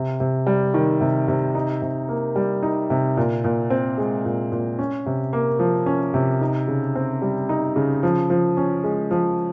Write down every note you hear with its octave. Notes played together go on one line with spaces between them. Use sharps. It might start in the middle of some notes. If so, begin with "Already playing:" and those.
Already playing: C3
C3
G3
D#3
C3
C3
D#4
C3
A#3
G3
D#4
C3
A#2
A#2
C4
G#3
A#2
A#2
C#4
C3
A#3
F3
C#4
C3
D#4
C#3
C4
G3
D#4
C#3
F3
F3
C#4
G#3
F3